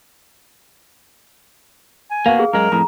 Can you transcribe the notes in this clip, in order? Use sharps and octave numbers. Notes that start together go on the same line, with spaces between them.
G#5
A#3 B3 F#4 F5
G#4
F#2 G#3 A#4
F2 A2 A#5